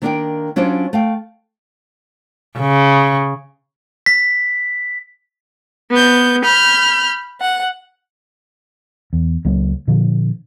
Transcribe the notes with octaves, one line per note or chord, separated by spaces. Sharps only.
D#3 A#3 D4 A#4 D5 G5
F#3 C#4 D4 F4 C5 D5
A3 F5 G5
C#3
B6
B3 G6
B5 F6 G6
F#5
E2
C#2 F#3 A#3
A#2 D3 F3